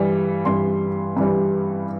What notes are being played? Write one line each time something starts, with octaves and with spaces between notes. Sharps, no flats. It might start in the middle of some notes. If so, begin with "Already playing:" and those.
Already playing: G2 E3 G3
G2 E3 G3 C6
G2 E3 G3